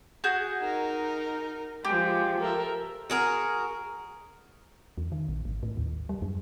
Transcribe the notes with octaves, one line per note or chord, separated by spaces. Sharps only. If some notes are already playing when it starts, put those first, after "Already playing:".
F#4 G#4 G6
D#4 A#4
F3 G#3 G4
A4 A#4 E5
F#4 G#4 A#4
E2
D#3
A#1
G#1
A2
D#2
G3
F#2